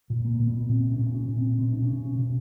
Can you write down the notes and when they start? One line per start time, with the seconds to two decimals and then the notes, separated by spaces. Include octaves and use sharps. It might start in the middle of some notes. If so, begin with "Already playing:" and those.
0.10 A#2
0.25 A#3
0.40 A#2
0.47 B3
0.69 A#2 C4
0.92 C#4
0.99 A#2
1.14 C#4
1.29 A#2
1.37 C4
1.59 B2 C4
1.73 D4
1.82 C#4
1.90 B2
2.04 C#4
2.19 B2